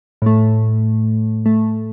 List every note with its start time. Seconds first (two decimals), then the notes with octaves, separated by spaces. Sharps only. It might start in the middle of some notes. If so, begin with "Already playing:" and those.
0.22 A2 A3
1.46 A3